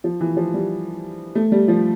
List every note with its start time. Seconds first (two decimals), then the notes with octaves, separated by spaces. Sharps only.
0.04 F3
0.21 E3
0.37 F3
0.54 G3
1.35 A3
1.52 G3
1.68 F3